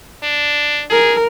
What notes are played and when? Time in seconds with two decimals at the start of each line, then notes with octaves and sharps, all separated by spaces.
0.23 D4
0.90 G#4 A#4